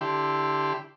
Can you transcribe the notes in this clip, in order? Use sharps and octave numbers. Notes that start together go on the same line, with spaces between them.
D3 E4 G4 C6